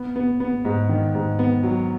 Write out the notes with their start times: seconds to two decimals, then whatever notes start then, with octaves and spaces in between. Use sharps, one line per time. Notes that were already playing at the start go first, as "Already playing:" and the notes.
Already playing: B3
0.16 B3
0.40 B3
0.65 G#2
0.89 D#3
1.15 G#2
1.39 B3
1.63 F#3